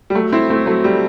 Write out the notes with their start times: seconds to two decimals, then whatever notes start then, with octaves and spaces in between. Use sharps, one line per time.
0.10 G3
0.15 F#3 A3
0.32 C4 E4
0.50 A3 C4
0.66 F#3 A3
0.84 G3